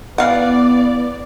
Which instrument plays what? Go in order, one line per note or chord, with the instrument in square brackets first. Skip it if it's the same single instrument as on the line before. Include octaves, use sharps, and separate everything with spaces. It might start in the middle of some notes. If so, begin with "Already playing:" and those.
[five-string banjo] E3 F5 F#5 [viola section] B3 D5